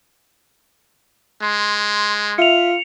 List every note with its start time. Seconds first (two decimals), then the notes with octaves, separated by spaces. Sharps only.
1.42 G#3 C6
2.38 F4 E5 C#7 F7